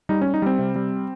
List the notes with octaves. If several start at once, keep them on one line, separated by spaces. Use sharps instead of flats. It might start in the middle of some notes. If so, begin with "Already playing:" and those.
G3 D#4
C#4
G3
D#4
G3 C4
C3
G3